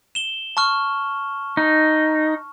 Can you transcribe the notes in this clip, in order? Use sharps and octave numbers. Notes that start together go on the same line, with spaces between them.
E7 G7
A5 C#6 F6
D#4